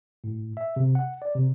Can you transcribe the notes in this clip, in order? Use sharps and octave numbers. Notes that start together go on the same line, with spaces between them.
A2
E5
C3
F#5
D5
C3